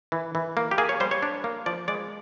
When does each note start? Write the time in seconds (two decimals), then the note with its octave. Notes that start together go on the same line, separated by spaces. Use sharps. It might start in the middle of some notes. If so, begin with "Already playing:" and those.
0.12 E3
0.35 E3
0.57 A#3
0.71 G4
0.78 A#3 G#4
0.89 C#5
1.00 G3 C5
1.11 C#5
1.23 D4
1.44 A#3
1.66 F3 D5
1.88 G#3 D5